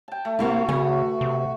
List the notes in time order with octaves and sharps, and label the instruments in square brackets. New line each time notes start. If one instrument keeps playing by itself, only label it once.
[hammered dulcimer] G5 A5
A3
[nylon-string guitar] C3 A#3 E4 [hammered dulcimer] A3 [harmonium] F#4
[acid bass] C#3 [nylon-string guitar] B3 G#5
[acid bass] C3